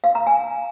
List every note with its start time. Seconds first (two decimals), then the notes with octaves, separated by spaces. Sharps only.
0.04 F5
0.15 A#5
0.27 G#5